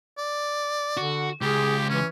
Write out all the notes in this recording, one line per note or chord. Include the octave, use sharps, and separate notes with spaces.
D5
D3 F#4
C#2 G4 G#4
E3 C#4